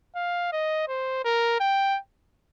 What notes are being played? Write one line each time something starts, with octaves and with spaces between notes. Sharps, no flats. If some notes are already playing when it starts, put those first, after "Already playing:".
F5
D#5
C5
A#4
G5